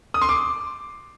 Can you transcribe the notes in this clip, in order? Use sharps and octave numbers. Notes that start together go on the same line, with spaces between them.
D#6
C6
D6